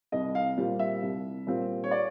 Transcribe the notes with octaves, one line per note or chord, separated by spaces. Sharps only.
C2 D#5
F5
A#2 G3 C4
E5
C2
A#2 G3 C4
C#5
D5